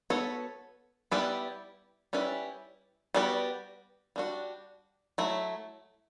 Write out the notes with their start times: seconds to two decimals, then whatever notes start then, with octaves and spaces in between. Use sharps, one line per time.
0.10 B3 F#4 A4 C#5
1.11 G3 B3 E4 B4 D5
2.13 G3 C#4 E4 B4 D5
3.14 G3 B3 F#4 B4 D5
4.16 G3 D4 F#4
5.18 F#3 A3 E4